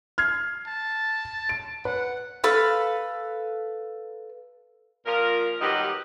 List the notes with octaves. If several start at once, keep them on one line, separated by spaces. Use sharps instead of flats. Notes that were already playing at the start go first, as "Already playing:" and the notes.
F6 G#6 C7
A5
D7
B4 F#5
A4 B4 F5
A#2 F3 F4 A#4
D#3 F#3 G3 G4 B4 D#5